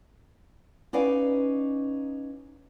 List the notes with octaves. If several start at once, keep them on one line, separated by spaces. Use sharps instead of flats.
C#4 D#4 B4 D5 F5 G#5